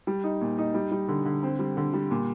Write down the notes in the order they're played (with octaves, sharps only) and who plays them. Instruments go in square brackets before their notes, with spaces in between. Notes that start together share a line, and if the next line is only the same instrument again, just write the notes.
[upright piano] G3
D#4
A#2
D#4
G3
G3
D3
D3
C4
G3
D3
G3
A#2